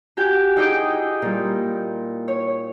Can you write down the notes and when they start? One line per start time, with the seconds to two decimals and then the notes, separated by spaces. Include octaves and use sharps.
0.17 F#4 G4 G#5 G6
0.56 D#4 E4 G#4 D#5 G5 D6
1.22 A#2 G3
2.28 C#5